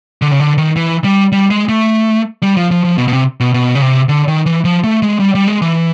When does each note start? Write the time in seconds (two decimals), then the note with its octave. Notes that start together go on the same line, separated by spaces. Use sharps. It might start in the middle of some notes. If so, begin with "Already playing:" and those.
0.22 D3
0.31 C#3
0.40 D3
0.58 D#3
0.76 E3
1.04 G3
1.32 G3
1.51 G#3
1.69 A3
2.43 G3
2.57 F3
2.71 F3
2.84 F3
2.98 B2
3.08 B2
3.13 C3
3.40 B2
3.54 B2
3.75 C#3
3.82 C3
4.09 D3
4.28 D#3
4.46 E3
4.65 F3
4.84 A3
5.02 G#3
5.20 G3
5.35 G3
5.48 G#3
5.62 E3